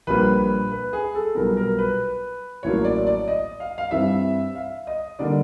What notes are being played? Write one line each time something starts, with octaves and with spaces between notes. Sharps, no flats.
A#1 A#2 G3 A#3 B4
B4
G#4
A4
B1 A#2 G3 B3 A#4
A#4
B4
A1 A2 F#3 A#3 C#5
D5
D5
D#5
F5
F5
G2 E3 G3 C4 E5
F5
D#5
D3 G3 A#3 D5